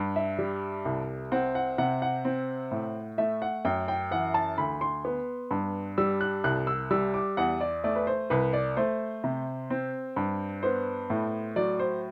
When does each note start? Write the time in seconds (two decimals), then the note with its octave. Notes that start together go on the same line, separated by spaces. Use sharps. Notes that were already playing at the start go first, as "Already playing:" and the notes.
Already playing: G2
0.16 E5
0.39 G3
0.85 C2
1.32 C4 F#5
1.55 F#5
1.78 C3 F#5
2.02 F#5
2.25 C4
2.71 A2
3.18 A3 E5
3.42 F#5
3.65 F#2 G5
3.88 G5
4.11 E3 F#5
4.34 A5
4.58 D2 B5
4.81 C6
5.05 B3
5.51 G2
5.98 G3 E6
6.21 F#6
6.44 C2 F#6
6.67 E6
6.91 G3 E6
7.14 D6
7.37 E2 F#5
7.61 D5
7.84 A3 D5
7.96 B4
8.07 C5
8.30 C2 B4
8.53 D5
8.77 A3 C5
9.24 C3
9.70 C4
10.16 G2
10.63 B3 C5
11.10 A2
11.56 F#3 D5
11.79 C5